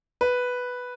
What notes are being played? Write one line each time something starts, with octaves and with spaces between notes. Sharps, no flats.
B4